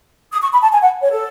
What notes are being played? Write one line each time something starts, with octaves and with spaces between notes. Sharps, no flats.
D#6
C#6
B5
A5
G#5
F#5
C#5
A4